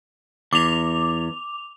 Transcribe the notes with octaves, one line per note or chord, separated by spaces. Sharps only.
E2 D6 F7